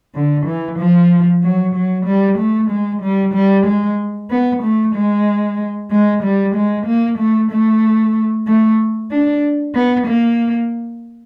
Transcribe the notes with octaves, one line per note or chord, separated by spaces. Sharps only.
D3
E3
F3
F#3
F#3
G3
A3
G#3
G3
G3
G#3
B3
A3
G#3
G#3
G3
G#3
A#3
A3
A3
A3
D4
B3
A#3